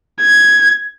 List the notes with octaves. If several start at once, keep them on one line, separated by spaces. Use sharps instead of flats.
G#6